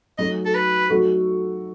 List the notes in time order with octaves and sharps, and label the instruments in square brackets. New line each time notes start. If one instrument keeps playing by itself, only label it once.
[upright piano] F#3 A3 D#4 F#4 [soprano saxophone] D#5
[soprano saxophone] A4
B4
[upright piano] F#3 A3 D#4 F#4 A4